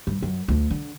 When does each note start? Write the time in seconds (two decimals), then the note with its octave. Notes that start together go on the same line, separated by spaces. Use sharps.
0.07 G2
0.22 F#2
0.48 D2
0.70 D3